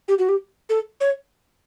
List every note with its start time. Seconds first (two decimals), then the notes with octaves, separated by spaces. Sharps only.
0.08 G4
0.19 F#4
0.29 G4
0.69 A4
1.01 C#5